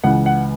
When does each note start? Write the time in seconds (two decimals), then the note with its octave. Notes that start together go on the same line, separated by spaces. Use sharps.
0.04 C#2 C#3 E3 F#5
0.26 F#5